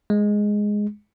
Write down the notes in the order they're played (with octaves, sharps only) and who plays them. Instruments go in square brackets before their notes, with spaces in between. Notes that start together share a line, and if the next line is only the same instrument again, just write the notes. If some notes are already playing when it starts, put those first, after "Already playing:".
[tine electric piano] G#3